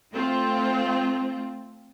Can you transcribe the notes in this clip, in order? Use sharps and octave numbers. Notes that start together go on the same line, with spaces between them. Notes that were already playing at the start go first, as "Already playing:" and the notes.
A3 C4 F4